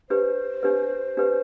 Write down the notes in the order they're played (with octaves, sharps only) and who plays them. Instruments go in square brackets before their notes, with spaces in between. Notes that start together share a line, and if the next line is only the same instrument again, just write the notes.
[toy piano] D4 G4 B4 [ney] C5
[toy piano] D4 G4 B4
D4 G4 B4